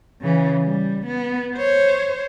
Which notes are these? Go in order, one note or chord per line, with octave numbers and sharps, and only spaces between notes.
C#3 E3
G3
B3
C5 C#5